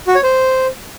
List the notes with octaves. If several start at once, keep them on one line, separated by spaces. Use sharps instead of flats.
F#4
C#5
C5